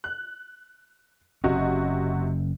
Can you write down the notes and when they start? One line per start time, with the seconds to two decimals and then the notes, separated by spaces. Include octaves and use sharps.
0.04 F#6
1.44 F#1 C3 C#4 F#4 D#5